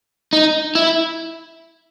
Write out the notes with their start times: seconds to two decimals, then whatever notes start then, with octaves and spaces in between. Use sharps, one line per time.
0.33 D#4
0.75 E4